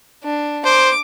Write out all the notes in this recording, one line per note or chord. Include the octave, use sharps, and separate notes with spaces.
D4
C5 D6